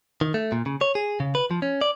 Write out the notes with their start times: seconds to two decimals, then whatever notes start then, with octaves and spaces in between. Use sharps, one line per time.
0.21 D#3
0.34 A3
0.52 A#2
0.66 C#3
0.81 C#5
0.95 G#4
1.20 C#3
1.35 B4
1.51 F3
1.62 C#4
1.81 D5